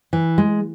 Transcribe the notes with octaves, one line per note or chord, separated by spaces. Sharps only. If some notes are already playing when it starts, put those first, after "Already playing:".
E3
G#3